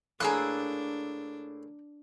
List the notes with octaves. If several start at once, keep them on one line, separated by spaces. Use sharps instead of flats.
A2 A#3 D4 G#4 A5 A#5 E6 F#6